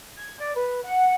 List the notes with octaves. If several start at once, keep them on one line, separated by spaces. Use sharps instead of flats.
G#6
D5
B4
F#5